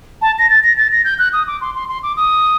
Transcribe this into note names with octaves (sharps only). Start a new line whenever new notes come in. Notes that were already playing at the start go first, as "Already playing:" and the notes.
A5
A#6
A6
A#6
A6
A#6
G6
F#6
D#6
D6
C6
C6
C6
D6
D#6